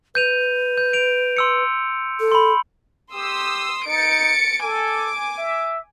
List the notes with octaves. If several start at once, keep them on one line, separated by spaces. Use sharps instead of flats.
B4 G6 D#7 F7
G6
D7 F7
C6 E6 C#7
A4
B5 C6
G4 C6 D#6 E6
D#4 A6 C#7 D7
A4 G#5 D6
E5